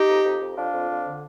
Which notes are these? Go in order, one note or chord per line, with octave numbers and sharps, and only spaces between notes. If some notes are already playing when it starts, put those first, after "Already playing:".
Already playing: D#4 G4
F2
F2
F2
F2 D4 F4
F2
F2
D3